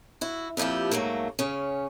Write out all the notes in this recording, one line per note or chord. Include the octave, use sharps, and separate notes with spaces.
E4 F#4
F2 A#2 F3 E4 G4
G#2 F#3 A3 A#3
C#3 C#4